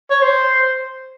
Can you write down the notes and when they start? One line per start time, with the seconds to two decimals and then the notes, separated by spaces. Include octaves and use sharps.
0.11 C#5
0.22 C5